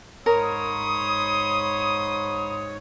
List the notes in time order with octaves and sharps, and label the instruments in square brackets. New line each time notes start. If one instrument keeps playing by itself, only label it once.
[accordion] G#2 C#5 [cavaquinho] A#4 [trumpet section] B5 C6 D#6